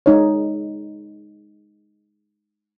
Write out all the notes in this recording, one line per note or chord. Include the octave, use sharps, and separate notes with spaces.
G#3 D#4 C#5